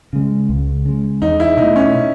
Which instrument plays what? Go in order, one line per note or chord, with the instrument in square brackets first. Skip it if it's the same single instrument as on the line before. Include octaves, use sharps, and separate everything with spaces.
[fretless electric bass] C#3 G#3
C#2
C#3 G#3
[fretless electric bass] E2 [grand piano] D#4
[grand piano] E4
[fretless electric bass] B2 A3 [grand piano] D#4
[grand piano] C#4